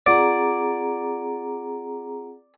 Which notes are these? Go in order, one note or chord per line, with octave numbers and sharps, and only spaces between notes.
C4 F4 G#4 D5 F#5 A#5 D7